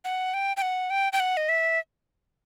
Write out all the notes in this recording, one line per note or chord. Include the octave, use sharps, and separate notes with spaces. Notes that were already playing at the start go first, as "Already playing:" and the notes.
F#5
G5
G5
F#5
G5
G5
F#5
D#5
E5